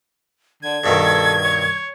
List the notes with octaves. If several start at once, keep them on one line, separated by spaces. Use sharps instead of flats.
D3 G#6
G2 B2 D#3 A4
C#5